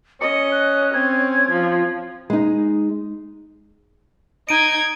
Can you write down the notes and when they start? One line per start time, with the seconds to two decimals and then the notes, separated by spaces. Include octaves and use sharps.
0.21 C#4 D#5 C#7
0.52 F#6
0.93 C4 G#6
1.49 F3
2.30 G#3 D#4
4.49 D#4 G#6 D7 D#7